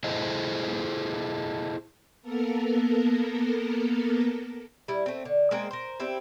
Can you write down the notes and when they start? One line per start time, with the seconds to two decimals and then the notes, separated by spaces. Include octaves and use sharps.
0.04 E4 G#4 A4 C5 D#5
2.22 A#3 B3 A4 A#4
4.88 G3 E4
5.06 A3 C4
5.25 D3
5.51 G#3 A#3 C4 A#4
5.71 A#4 C5
6.00 C4 E4 G4